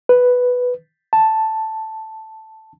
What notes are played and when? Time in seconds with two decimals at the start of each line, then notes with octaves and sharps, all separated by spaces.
0.09 B4
1.13 A5